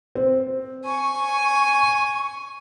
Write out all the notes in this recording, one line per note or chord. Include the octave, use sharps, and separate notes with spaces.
C4
G#5 C#6